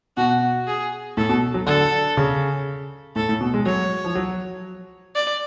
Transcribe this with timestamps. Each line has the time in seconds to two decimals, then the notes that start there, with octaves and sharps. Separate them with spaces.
0.17 B2 F#4
0.67 G#4
1.17 A2 A4
1.29 B2
1.54 F#3
1.66 D3 A4
2.17 C#3
3.16 A2 A4
3.29 A2
3.41 B2
3.54 G#3
3.66 F#3 C#5
4.04 F3
4.15 F#3
5.15 D5